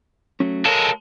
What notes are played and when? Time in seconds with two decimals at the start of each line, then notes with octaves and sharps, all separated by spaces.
0.40 F#3 A3 C#4
0.65 G#3 A4 A#4 C#5 F5